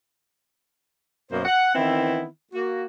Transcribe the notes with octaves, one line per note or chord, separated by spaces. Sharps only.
F#2 B2 A#3 C5
F#5
D#3 E3 B3 C4 E4
A#3 F#4